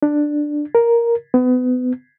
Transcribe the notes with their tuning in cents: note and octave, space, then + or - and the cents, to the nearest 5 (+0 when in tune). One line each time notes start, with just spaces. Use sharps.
D4 +10
A#4 +5
B3 +30